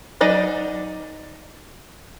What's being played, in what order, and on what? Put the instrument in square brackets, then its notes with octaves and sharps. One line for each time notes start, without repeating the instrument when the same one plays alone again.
[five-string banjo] F#3 D#4 D5 D#5 G#5